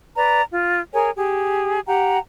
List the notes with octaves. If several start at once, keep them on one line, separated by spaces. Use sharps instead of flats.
B4 D5 A#5
F4
G#4 A#4 C#5 G#5
G4 G#4
G4 F#5 G5 A#5